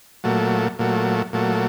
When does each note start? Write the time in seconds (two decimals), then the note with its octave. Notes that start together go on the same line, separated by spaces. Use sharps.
0.24 A#2 F#3 A3
0.79 A#2 F#3 A3
1.33 A#2 F#3 A3